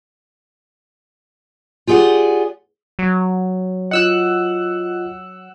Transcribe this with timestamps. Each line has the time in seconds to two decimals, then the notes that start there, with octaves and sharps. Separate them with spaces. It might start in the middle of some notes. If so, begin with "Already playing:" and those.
1.87 F4 G4 G#4 D5 F#5
2.99 F#3
3.91 F4 D#5 F#5 E6 F#6